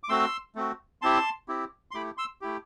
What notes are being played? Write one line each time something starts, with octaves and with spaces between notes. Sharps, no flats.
D6
A3 C4 F#4 C6 E6
A3 C4 F#4
C4 E4 G4 A5 C6
C4 E4 G4
C6
A3 E4 G4 B5 D6
C6 E6
A3 E4 G4